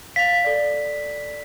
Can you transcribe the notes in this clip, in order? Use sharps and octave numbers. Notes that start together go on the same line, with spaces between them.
F5 A6 B6 F7
A4 D5